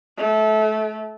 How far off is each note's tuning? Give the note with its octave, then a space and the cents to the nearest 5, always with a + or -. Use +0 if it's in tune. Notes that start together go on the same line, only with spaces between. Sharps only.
A3 -25